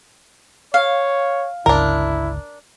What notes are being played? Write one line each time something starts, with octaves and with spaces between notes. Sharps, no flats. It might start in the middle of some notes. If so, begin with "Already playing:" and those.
C#5 F5
G1 C#2 D4 E4 A#4